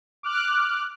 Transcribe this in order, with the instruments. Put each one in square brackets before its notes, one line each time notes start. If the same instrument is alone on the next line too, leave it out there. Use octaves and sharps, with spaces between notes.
[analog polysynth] D6 F6 F#6